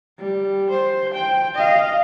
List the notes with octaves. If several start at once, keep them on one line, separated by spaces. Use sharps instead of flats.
G3
C5
G5
D#5 F5